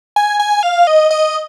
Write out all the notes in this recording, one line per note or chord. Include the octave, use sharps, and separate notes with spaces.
G#5
G#5
F5
D#5
D#5